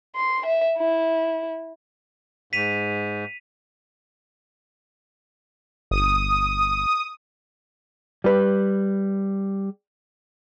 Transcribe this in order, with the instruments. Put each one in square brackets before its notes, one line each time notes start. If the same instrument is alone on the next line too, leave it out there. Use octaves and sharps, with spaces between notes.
[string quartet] C6
E5
E4
[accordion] G#2 [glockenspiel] B6 D#7 F7
[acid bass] G1 [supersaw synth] D#6
[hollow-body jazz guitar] G3 B4